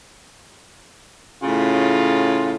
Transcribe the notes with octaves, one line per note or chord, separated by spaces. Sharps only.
A2 C#3 F4